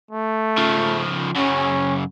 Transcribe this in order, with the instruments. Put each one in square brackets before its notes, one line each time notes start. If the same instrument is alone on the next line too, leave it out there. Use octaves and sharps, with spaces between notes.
[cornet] A3
[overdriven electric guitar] C#3 F3
[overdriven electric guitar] F#2 C#3 [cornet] C#4